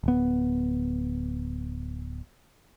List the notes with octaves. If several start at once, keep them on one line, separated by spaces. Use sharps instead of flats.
D1 B3